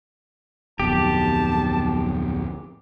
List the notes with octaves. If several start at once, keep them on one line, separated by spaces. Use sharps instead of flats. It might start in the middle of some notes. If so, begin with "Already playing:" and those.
D1 B1 F2 G4 A5